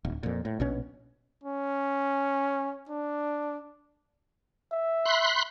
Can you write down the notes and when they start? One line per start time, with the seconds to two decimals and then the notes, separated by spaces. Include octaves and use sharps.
0.05 D1
0.23 F2 A#2
0.45 A2
0.60 A#1 B2 C#4
1.44 C#4
2.89 D4
4.72 E5
5.05 B5 C6 F#6